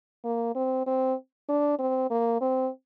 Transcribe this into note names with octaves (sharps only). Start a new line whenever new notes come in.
A#3
C4
C4
D4
C4
A#3
C4